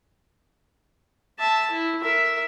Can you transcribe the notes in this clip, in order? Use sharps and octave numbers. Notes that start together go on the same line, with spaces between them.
E5 A5
E4
A#4 E5